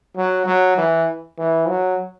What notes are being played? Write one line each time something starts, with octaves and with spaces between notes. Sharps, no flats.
F#3
F#3
E3
E3
F#3